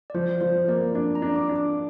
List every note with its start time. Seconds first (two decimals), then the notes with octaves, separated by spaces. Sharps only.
0.10 D5
0.14 F3 C5
0.41 F3 C5
0.68 A#3 D5
0.95 D4 D5
1.15 A#5
1.22 D4
1.36 D6
1.49 D4
1.56 D6